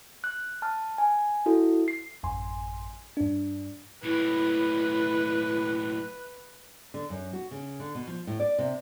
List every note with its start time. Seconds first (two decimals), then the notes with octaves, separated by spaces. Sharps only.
0.24 F#6
0.62 A5 F6
0.98 G#5
1.46 E4 F#4 A4
1.88 C7
2.23 A1 F#2 G#5 C6
3.17 G2 D4
4.03 B1 A2 E4 B4
6.94 D3
7.10 F#2
7.33 F#4
7.51 C#3
7.80 D3
7.95 B2
8.07 F3
8.27 A2
8.40 D5
8.58 C3